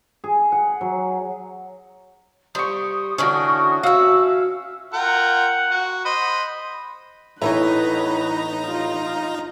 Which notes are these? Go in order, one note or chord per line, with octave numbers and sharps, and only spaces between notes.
G#4
F#5
F#3
G3 C5 C#6 D#6
D3 E3 C#4 D4 F#4
F#4 E5 F5 E6
F4 A#4 F#5 G5
F#4
C5 D#5 B5
A2 E3 B3 D#4 B4 C#5 E5 A#5
F4